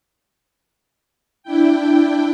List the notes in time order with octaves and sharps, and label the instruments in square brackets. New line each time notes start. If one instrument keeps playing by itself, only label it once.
[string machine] D4 E4 G5